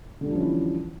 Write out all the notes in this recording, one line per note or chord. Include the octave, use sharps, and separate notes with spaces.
D3 E3 F3 G3 C#4